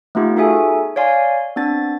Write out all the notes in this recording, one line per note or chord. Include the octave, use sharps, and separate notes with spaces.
A3 B3 D#4 F4 G4
D#4 F#4 G#4 A4 E5 G#5
C#5 D5 F5 G#5 C6
B3 C4 D4 A6